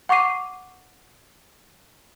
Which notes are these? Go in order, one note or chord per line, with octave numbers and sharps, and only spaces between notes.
F#5 C#6 D6 C7 D#7